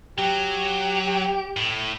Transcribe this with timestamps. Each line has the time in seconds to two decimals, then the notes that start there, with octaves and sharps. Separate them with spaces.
0.18 F#3 G4
1.57 A2